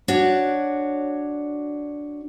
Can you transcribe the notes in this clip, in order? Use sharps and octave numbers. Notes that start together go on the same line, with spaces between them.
D4 F#4 C#5 D5